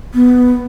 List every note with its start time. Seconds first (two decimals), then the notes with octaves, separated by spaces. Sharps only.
0.14 B3